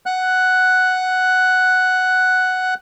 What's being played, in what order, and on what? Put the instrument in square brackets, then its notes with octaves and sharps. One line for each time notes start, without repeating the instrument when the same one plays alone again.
[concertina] F#5 F#6